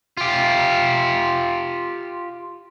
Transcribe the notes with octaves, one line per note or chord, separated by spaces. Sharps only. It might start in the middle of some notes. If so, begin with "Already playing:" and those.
F4 G4